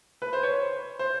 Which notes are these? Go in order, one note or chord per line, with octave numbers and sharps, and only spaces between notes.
B4
C5
C#5
C5